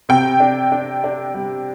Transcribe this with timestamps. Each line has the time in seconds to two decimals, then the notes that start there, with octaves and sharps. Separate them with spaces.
0.09 C3 G5
0.40 D4
0.72 D4
1.04 D4
1.35 G3